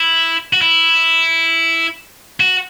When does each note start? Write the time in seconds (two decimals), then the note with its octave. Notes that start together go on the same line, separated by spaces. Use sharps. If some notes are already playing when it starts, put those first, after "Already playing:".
Already playing: E4
0.53 F#4
0.62 E4
2.40 F#4